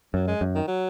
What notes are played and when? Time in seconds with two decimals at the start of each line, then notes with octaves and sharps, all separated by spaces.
0.14 F#2 F#3
0.27 G#3
0.41 F#2
0.55 D#3
0.68 F#3